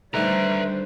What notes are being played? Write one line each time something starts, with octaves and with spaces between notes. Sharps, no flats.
D3 D#3 G3 A3 B4 C5 E5 A#5